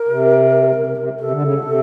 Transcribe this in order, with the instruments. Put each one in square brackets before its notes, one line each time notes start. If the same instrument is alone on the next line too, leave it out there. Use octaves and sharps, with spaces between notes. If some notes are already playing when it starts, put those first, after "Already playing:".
Already playing: [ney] A#4
[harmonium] C3
C3
C3
C3
[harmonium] C3 [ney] A4
[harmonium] D3
C#3
C3
C3